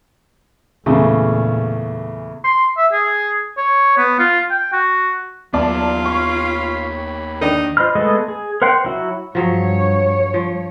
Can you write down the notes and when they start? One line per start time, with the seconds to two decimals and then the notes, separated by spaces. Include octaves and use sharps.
0.86 E2 A#2 C#3 A3
2.44 C6
2.77 E5
2.92 G#4
3.58 C#5
3.97 B3
4.19 F4
4.51 G5
4.73 F#4
5.54 D#2 F#3 B3 F4 D5 A5
6.05 G4 C#5 B5 C#6
7.41 D#3 D4 D#4
7.77 F4 C5 D#5 B5 F6
7.95 G#3 A3 B3 A4 D#5
8.28 G#4
8.62 A#4 C5 F#5 G5 C6
8.85 F#3 E4 F#4
9.35 G2 F3 F#3 G#4 C#5
10.34 F3